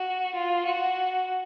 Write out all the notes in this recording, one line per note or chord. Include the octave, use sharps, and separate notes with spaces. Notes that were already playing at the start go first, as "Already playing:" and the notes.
Already playing: F#4
F4
F#4